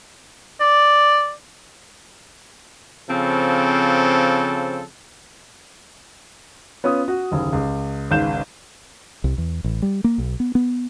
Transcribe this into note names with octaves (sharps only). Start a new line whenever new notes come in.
D5
C#3 F3 C4 A4
B3 C#4 F4 D#6
F#4
F#1 D#2
C#2
G#1 C#2 F5 G6 E7
C2
E2
A1
G3
A#3
B1
B3
B3